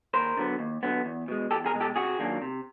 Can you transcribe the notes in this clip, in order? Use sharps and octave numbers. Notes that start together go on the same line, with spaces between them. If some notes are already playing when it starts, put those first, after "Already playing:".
D#2 A#4 C5
D3 F#3 B3
D#2
D3 F#3 B3
E2
B2 G#3
E2 G4 A4
G#4 A#4
B2 G#3
G4 A4
C3 F#4 G#4
D#3 F#3 A#3 D4
C3